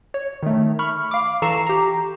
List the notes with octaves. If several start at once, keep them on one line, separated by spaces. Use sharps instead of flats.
C#5
D#3 A3
B5 C#6 F6
F5 D6
E3 A4 A#5 C#6 C7 E7
G4 A#5